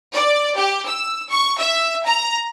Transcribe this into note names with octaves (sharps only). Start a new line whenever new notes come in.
D5
G4
E6
C#6
E5
A#5